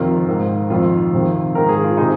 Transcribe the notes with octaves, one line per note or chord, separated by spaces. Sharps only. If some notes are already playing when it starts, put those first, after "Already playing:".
Already playing: F2 C3 D#3 F4 A#4
G#2 D#3
F2 D#3 F4
F2 C3 D#3
G#2 D#3 A#4
G#4
F4
C3 D#4 G#4